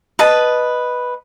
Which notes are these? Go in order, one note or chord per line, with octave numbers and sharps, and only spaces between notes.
B4 D#5 A5